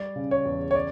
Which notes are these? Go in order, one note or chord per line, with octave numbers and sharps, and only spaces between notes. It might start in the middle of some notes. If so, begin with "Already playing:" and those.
Already playing: G3 D5
C#3
C#5
E2
C#5
D5